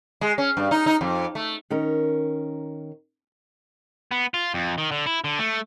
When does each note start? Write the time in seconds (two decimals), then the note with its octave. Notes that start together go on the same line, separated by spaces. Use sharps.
0.21 G#3
0.38 C#4
0.57 G2
0.71 D#4
0.86 D#4
1.01 F2
1.35 A3
1.70 D#3 C#4 A#4
4.11 B3
4.34 F4
4.54 F2
4.78 D#3
4.92 D3
5.06 E4
5.24 D3
5.39 A3